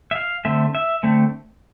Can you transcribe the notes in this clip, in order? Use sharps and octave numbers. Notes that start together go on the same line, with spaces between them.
E5
F5
D3 A3 C4 E5
E5
D3 A3 C4